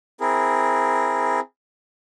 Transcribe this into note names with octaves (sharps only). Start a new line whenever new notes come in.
C4 E4 G#4 A#4